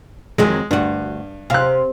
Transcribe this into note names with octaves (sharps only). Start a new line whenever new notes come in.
F2 D#3 F#3 G#3
D2 G2 F#4
C3 F5 F#6